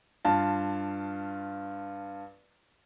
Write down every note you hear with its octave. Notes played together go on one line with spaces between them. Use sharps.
G2 F4 A5